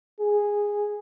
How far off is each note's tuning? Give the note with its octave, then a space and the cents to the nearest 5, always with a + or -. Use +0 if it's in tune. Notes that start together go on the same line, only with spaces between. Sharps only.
G#4 -10